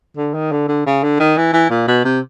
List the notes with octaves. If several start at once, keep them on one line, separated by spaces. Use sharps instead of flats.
D3
D#3
D3
D3
C#3
D3
D#3
E3
E3
A#2
B2
C3